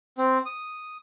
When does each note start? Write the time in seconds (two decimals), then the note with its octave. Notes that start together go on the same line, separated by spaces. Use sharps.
0.18 C4
0.46 D#6